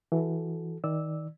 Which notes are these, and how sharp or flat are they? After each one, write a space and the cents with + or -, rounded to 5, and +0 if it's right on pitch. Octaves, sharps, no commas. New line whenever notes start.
E3 +0 F#4 +0 A4 -20
D#3 +25 D5 +0 E6 -10